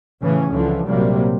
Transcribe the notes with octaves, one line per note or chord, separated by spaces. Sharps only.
A2 C#3 E3 C#4
C#2 D3 E3 F3
A#1 C3 F#3 G3 A#3